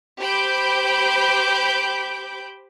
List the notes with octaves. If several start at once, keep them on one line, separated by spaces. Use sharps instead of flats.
G4 C5 B5 D6 G6 D7